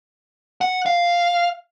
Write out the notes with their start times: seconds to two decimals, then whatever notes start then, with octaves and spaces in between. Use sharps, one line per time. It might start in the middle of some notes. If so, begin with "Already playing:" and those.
0.61 F#5
0.86 F5